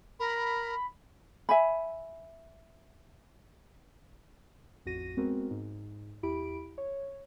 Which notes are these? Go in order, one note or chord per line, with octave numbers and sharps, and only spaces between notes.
A#4 B5
E5 G#5 B5
A1 F2 F#4 A#6 D#7
G#3 B3 C4 F#4 A#4
G#2
E2 E4 G4 B5 D7
C#5